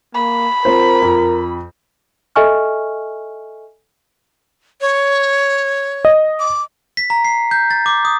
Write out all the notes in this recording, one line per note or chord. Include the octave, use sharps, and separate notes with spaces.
A#3 B5
C4 F4 A#4 C5
F2
A4 D#5 E5 G#5 C#6 F6
C#5
D#5
D6
B6
A#5
C7
G6
A6
D6
D#6